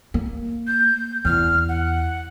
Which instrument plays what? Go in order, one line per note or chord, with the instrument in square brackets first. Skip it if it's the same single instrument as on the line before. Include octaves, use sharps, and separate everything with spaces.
[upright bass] A#3
[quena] G6
[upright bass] E2 [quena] F6
[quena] F#5